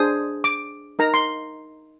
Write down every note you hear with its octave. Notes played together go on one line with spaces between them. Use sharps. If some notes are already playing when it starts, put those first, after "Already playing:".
Already playing: D4 G#4 C5 D#6
D6
D#4 A#4 A#5
C6